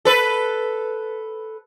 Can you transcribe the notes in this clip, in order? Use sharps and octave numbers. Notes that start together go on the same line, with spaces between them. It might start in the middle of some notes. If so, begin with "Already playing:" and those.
A4 B4